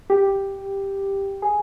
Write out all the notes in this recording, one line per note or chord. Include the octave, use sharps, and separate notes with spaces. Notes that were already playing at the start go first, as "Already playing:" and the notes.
G4
G#4